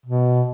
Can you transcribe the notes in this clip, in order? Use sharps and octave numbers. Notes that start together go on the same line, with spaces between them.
B2